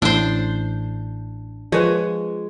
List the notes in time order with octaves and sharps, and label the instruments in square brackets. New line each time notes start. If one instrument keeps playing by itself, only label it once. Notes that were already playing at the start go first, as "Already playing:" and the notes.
[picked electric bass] A1 A2 [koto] D4 C5
[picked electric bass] F3 [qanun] G#3 [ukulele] F4 B4 C#5